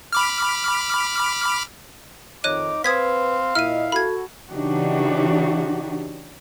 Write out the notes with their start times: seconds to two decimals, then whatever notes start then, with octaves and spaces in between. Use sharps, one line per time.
0.13 B5 D6 F6
2.44 F2 D#3 D#4 C#5 D6 F#6 D#7
2.84 C4 B4 F5 D#6 G#6 B6
3.55 A#2 E4 D#5 F6 D#7
3.92 F#4 A4 B5 G#6
4.50 C#3 E3 D4 D#4 F#4 G4